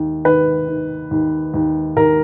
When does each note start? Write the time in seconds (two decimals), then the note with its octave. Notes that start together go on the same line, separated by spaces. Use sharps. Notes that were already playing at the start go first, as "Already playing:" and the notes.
Already playing: D#2
0.25 D#3 B4
0.68 D#3
1.11 D#2
1.54 D#2
1.97 D#2 A#4